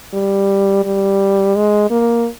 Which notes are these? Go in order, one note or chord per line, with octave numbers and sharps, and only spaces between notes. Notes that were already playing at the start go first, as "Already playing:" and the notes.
G3
G3
G#3
A#3